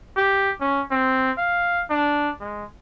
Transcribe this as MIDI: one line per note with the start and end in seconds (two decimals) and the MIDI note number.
0.17 0.52 67
0.60 0.82 61
0.91 1.31 60
1.38 1.85 77
1.90 2.30 62
2.40 2.64 56